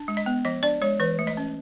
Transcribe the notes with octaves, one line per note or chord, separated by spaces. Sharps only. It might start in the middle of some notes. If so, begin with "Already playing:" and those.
Already playing: D4
G#3
D#5
B3
F3 D#5
D4 D5
G#3 C#5
E3 B4
A3
D#5
C#4